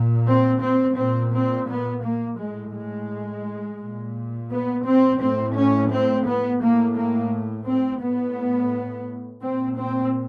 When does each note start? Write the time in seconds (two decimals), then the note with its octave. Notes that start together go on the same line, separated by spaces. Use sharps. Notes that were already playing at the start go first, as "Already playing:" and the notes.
Already playing: A#2
0.27 C4
0.62 C4
0.98 A#2 C4
1.34 C4
1.69 B3
2.04 A#3
2.38 A2 G#3
2.74 G#3
3.79 A#2
4.50 B3
4.85 C4
5.20 A2 C4
5.55 C#4
5.91 C4
6.26 B3
6.60 A2 A#3
6.96 A#3
7.67 C4
8.01 A2 B3
9.42 A#2 C4
9.77 C4